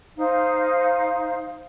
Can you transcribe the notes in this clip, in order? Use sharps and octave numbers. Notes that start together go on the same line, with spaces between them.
D#4 C5 F5